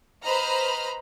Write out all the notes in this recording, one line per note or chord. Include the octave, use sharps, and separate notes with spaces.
B4 C5 D#5 A#5 B5 F6